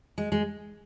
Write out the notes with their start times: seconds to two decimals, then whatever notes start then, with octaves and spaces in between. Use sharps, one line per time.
0.18 G#3
0.32 G#3